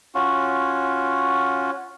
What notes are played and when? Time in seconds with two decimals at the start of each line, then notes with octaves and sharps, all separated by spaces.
0.15 C#4 F4 F#4